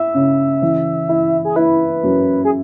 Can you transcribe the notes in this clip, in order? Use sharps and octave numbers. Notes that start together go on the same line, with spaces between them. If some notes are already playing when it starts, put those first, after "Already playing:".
Already playing: E4 E5
C#3
E3
E4
G#4
E4 B4
F#2
G#4